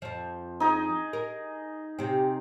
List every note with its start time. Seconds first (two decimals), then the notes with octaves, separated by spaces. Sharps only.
0.02 F2 F3
0.60 D#4 G#4
1.13 A#4
1.99 C3 C4